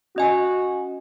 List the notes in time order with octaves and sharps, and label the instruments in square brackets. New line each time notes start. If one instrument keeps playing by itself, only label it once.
[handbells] C#4 D#5 G#5 [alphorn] F#4